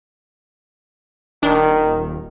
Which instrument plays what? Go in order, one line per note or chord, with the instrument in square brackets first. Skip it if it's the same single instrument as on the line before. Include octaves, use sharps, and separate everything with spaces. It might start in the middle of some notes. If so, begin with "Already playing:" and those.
[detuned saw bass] D#1 [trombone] D#3 [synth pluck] D4